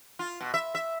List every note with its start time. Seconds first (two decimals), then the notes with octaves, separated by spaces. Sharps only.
0.19 F4
0.41 B2
0.54 E5
0.75 E5